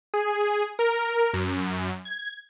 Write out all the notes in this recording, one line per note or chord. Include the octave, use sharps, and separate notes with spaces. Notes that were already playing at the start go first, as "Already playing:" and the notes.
G#4
A#4
F#2
G#6